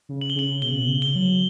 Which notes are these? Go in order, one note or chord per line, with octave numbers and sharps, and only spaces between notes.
C#3
F#7
G7
C#3 F#7
B2 G7
C#3
B2
C#3
G7
F#3